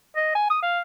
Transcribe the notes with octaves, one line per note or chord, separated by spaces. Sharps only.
D#5
G#5
D#6
F5